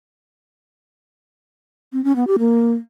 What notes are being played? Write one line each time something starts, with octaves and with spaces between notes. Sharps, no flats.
C4
C#4
B3
G4
A#3